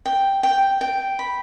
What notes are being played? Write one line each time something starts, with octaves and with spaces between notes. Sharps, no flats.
G5
G5
G5
B5